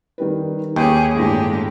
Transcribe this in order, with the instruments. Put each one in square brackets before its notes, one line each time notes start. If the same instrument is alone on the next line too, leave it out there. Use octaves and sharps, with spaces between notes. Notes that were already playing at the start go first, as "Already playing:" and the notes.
[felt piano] D#3 G3 B4
[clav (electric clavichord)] D#2 [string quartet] C#4 G4 G#4 [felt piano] G5
[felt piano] G1 A2 [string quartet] G#3 D4 G4